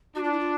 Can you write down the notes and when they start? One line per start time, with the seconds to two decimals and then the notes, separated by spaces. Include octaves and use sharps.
0.15 D4 F#4
0.24 F4
0.31 E4
0.39 F4